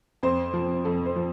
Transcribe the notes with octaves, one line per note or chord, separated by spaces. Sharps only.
F2 C5
F3
F2 A4
C5
F3